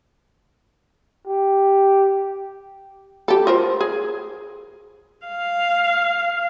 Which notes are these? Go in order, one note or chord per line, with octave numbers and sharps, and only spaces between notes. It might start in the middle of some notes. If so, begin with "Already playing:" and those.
G4
G4 A4
F4 A#4 C5
G#4
F5